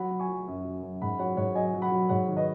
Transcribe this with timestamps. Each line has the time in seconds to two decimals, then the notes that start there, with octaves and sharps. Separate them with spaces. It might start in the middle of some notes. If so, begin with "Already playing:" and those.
Already playing: F#3 F#5 B5
0.11 F#3
0.19 G#5 C#6
0.29 F#3
0.48 F#2
0.64 F#3
0.83 F#2
1.01 G#2 F#5 B5
1.19 F#3 C#5 F#5
1.37 G#2 C#5 F#5
1.55 F#3 D#5 G#5
1.74 F#3
1.82 F#5 B5
1.92 F#3
2.09 G#2 C#5 F#5
2.28 D#3
2.36 B4 D#5